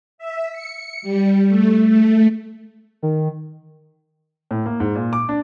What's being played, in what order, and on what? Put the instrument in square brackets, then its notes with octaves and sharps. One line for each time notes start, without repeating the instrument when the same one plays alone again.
[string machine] E5
C#7
G3
A3
A3
[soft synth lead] D#3
[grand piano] A2
A#3
G#2
A#2
D6
D4